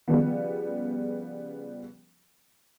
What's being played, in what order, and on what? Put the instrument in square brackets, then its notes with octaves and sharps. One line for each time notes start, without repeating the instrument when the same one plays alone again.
[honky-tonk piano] C#3 F3 G3 B3